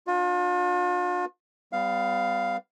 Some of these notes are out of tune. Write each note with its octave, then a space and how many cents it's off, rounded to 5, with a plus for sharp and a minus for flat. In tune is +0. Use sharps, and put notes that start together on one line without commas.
D4 +10 F4 +40
G3 +0 B3 +40 F5 +0